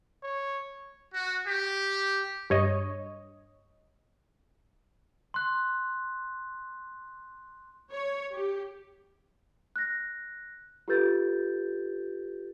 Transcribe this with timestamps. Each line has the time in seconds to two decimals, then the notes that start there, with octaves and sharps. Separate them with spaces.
0.23 C#5
1.14 F#4
1.47 G4
2.50 G2 C#5 D#5
5.34 C6 F#6
7.92 C#5
8.33 G4
9.76 F#6 A#6
10.88 F4 G4 A4 B4 G6 A6